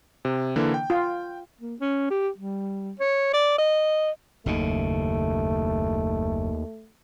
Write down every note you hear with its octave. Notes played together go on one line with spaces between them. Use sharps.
C3
D3 E3 A#3
G5
F4
A#3
C#4
G4
G3
C#5
D5
D#5
F#1 D#2 A2 C#3 A3